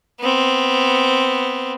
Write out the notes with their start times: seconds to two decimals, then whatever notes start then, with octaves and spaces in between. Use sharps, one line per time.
0.20 B3 C4